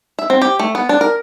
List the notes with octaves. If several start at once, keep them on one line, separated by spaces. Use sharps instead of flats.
E5
C4
G4
A3
B3
D4
A#4